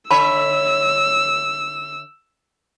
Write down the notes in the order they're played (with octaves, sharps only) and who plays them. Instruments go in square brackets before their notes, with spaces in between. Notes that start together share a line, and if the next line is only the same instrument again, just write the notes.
[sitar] D3 C#5 E5 [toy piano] A5 B5 [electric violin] E6